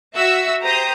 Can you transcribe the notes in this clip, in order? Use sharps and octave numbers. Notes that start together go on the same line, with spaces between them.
F#4 E5 E6
G4 C5 A#5 D#6